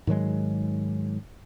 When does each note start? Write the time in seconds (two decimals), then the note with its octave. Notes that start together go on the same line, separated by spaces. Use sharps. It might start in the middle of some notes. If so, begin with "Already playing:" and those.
0.07 G#2 D#3 F#3 G#3